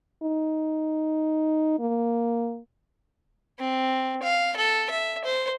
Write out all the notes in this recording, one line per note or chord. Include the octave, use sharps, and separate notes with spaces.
D#4
A#3
C4
F5
A4
E5
C5